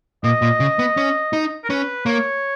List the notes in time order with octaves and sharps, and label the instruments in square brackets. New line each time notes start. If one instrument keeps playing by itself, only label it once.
[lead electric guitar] A#2 [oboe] D#5
[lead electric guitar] A#2
C#3
B3
C#4
D#4
[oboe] A#4
[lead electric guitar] C#4 [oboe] B4
[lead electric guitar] A#3 [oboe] C#5